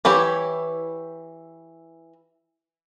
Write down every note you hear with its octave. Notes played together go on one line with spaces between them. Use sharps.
E3 E4 G4 C#5